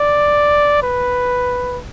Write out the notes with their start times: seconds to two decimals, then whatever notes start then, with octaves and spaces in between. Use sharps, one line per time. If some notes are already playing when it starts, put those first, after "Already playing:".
Already playing: D5
0.83 B4